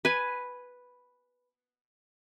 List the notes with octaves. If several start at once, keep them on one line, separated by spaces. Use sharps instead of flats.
B4 G#5